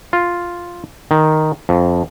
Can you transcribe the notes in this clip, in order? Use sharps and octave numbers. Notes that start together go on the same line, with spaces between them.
F4
D#3
F2